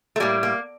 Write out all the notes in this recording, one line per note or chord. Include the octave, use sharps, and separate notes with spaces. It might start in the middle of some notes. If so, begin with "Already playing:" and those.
A3
A2 G3 A#3
A#3